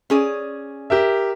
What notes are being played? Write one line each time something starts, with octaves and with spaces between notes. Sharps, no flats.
C#4 G#4 D5
G4 A#4 E5